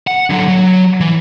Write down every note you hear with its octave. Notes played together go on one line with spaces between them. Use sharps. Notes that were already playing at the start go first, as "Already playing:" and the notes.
F#5
D3 F#3
F#3
E3